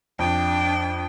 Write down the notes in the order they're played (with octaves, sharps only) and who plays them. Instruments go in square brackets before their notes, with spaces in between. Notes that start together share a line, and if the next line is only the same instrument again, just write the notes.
[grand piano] F2 [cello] D4 G5